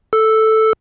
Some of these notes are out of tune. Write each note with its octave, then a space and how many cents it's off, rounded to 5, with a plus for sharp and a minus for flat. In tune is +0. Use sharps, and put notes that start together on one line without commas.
A4 +0 E6 +0